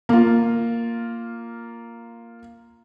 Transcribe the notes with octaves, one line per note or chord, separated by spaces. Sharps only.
A#3 F4